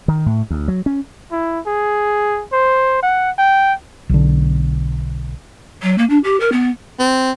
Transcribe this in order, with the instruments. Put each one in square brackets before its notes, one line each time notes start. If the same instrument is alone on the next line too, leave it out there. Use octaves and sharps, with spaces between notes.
[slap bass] D#3
A2
D2
F#3
C#4
[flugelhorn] E4
G#4
C5
F#5
G5
[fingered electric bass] B1 D3
[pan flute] F#3
A#3
D4
G4
A#4
B3
[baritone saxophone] C4